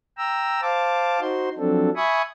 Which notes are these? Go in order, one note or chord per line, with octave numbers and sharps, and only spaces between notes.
G5 A#5 E6
C5 F5 A5 D6
D#4 F#4 C5 C6
F3 F#3 C4 D4 A4
E5 G#5 B5 C#6 D#6